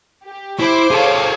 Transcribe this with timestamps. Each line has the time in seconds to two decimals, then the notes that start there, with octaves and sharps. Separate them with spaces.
0.25 G4
0.59 E4 C5 D6
0.91 G#4 A4 C#5 F5